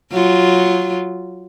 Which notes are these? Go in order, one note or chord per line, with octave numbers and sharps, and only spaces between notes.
F#3 F4